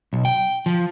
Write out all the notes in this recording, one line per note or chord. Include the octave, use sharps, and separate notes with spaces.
B1
G5
F3